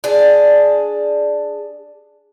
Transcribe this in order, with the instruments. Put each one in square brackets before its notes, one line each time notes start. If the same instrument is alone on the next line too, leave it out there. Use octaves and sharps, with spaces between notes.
[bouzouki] D4 G#4